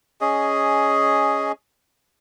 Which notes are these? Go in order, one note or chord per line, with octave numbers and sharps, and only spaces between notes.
C#4 G#4 D#5